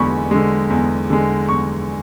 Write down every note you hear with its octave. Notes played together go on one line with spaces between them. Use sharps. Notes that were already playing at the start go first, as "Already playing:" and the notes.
Already playing: E2 D3 G#3 G#5 B5 C#6
D3 G#3
E2
D3 G#3
E2 C#6